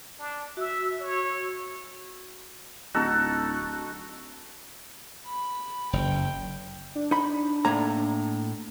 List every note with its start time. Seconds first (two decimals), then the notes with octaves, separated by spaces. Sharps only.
0.19 D4
0.57 F#4 E5 E6
1.00 C#5
2.94 D1 D#4 F#4 A4
5.27 B5
5.93 F#1 G5
6.95 D4
7.11 D#4 B5
7.65 A2 A#3 A#5